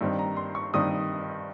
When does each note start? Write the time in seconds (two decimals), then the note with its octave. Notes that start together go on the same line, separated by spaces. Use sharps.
0.01 G2 D#3 G3 C4 D#4
0.19 A#5
0.37 C6
0.55 C#6
0.73 G2 D#3 G3 C4 D#4 D#6